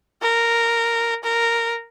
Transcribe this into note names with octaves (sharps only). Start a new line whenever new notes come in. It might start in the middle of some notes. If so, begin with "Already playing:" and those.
A#4
A#4